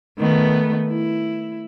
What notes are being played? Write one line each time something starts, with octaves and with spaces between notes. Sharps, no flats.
D#3 A3 B3
E4